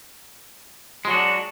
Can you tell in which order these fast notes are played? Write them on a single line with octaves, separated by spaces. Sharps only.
G#3 F#3 F#4 D4